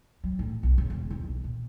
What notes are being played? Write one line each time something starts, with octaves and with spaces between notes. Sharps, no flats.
F#3
A2
B1
C#3
E1
D#2
B1
A#2